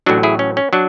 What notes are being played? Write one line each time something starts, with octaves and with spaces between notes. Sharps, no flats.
A1 A2 F#3 D4 F#4
E4 G#4
C#4
C#4
F#3 D4